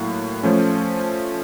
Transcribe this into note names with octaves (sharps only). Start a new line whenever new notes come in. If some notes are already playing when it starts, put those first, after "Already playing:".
Already playing: A2 F#3 A#3
F3 A3 C#4